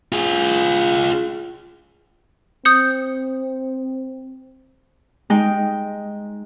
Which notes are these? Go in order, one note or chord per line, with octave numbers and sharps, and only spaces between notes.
F4 G#4
C4 D#6 G6 C#7
G#3 D#4 G5